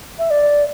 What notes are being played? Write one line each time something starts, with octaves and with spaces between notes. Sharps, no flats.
E5
D5